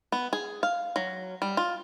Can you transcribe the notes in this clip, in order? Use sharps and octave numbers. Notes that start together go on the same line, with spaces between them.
B3
G#4
F5
F#3
G3
F4